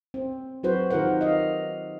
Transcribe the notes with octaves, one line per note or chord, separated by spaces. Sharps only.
C4
F#3 C4 F#4 B4 C5
D#3 F4 G4 A#4 C5 F#5
D#5 F5